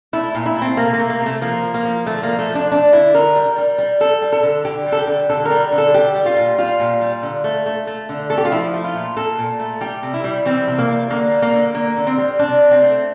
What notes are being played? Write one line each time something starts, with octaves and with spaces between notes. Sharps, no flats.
A3 E4
A#2
E4
A3
C4
C3 A#3
A#3
A3
A#3
C3
A3
F3 A#3
F3
A#3
F3
D3 A3
F3 A#3
A3
F3
D4
A3 D4
D3 E4
D3 A#4
G3
G3
G3
G3 A4
G3
A4
D3
D3 G4
G3
A4
G4
D3
D3 A4
A#4
G3
D3
A4
G3 G4
G3
F4
A#2
G3 F4
A#2
G3
D3
A3
A3
A3
D3
A3 A4
G4
F4
F3 E4
A3
F4
A#2
A#2 A4
A#2
A3
G3 G4
C3
E4
G3
E3 C4
C3
A#3
G3
D3 A#3
G3
A#3
D3
D3 A#3
D3
C4
G3
C3 D4
C3
C4
A3